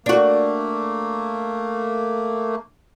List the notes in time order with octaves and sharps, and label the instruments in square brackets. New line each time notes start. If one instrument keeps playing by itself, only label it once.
[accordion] A3 A#3 [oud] D4 F#4